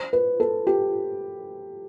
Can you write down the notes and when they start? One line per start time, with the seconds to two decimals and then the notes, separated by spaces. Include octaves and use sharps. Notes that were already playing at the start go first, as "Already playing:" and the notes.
Already playing: C5
0.13 B4
0.40 A4
0.67 G4